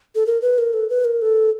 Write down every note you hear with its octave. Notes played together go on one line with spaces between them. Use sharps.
A4
A#4
B4
A#4
A4
B4
A#4
A4